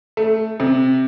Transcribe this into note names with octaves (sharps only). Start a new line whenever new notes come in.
A3
C3